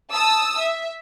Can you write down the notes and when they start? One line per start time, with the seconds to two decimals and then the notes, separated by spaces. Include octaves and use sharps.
0.13 A5 D#6 E6
0.59 E5